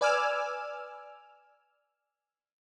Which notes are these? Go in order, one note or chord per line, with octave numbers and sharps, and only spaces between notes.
B4 D5 G#5 D6 E6 F6